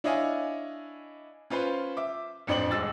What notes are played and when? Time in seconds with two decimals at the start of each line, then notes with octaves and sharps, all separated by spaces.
0.04 D4 E4 C#5 D#5 F5 G#5
1.50 C#4 F4 B4 C5
1.97 E5 D6
2.47 A1 F2 D4 C5 D6 F#7
2.71 D#1 G#3 E6 A6